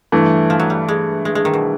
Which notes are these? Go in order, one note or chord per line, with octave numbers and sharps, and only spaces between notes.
G2 E3 A3
F3
F#3
G3
G#3
G#3
G#3
D#3
B2